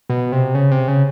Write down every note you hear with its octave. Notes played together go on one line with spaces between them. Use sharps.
B2
C3
C#3
C3
C#3